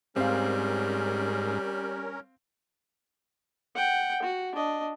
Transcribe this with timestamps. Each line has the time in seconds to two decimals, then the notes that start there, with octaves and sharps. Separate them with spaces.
0.16 G#2 G3 C4 C#4 A#4 F5
3.75 F#5 G5
4.23 F#4
4.55 D4 D#5